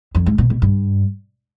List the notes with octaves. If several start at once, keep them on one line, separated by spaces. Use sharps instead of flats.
F2
G#2
B2
B2
G2